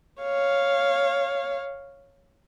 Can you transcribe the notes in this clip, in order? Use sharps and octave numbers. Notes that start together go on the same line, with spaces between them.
C#5 F5